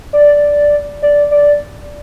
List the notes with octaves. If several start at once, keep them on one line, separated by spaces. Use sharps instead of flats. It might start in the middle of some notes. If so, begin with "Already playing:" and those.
D5
D5
D5